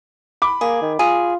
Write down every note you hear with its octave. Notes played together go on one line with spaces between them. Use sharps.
B5 D6
A#3 G#4
D#3
F4 G#4